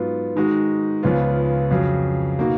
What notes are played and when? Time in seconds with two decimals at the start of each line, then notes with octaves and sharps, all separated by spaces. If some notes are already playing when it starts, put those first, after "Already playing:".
Already playing: G#2 F#3 B3 F4
0.36 D#3 G#3 D#4 F#4
1.03 C#2 C#3 F3 B3 F4
1.71 F2 C#3 F#3
2.39 B2 A#3 D#4 F#4